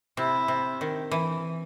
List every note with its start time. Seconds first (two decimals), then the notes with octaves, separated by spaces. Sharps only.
0.17 C3 E4
0.48 C3
0.81 D#3
1.11 E3